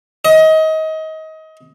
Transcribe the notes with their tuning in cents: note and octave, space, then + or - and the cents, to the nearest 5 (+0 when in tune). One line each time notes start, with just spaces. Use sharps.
D#5 +25